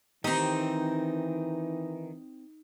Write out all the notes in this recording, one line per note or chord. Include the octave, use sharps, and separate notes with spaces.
D#3 E3 C4 D#4 G4